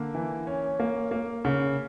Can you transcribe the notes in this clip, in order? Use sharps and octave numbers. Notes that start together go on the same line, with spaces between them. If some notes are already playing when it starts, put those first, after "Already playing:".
Already playing: D3 A#3
E3
C#4
A#3
A#3
C#3